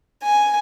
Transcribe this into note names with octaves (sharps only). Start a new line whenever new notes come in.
G#5